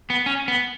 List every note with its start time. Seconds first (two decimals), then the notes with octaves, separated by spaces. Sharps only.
0.10 B3
0.26 C#4
0.48 B3